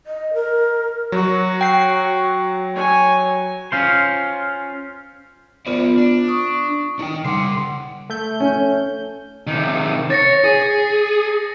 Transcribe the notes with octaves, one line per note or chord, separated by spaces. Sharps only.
D#5
A#4
F#3 F#4
G5 C7
C#5 G#5
C#4 F4 C5
B3 F4 A#4 C5 D5
D4
C#6 D#6
D4 D#4 G5
C#3 G3 F#5 C6 D6
A3 G6
C#4
C3 D#3
C#5 A6 A#6 C#7
G#4